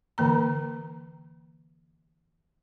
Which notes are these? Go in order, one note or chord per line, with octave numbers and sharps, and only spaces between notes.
D3 E3 A#3 A#5